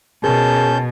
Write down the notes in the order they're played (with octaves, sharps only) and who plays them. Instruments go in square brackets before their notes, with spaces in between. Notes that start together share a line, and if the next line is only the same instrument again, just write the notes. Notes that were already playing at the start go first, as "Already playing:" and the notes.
[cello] B2 [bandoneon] C#4 G6 [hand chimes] G#4 A#4 [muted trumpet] A5